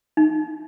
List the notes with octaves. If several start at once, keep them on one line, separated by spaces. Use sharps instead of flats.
D#4